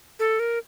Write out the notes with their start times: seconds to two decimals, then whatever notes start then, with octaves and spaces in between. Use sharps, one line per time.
0.19 A4
0.39 A#4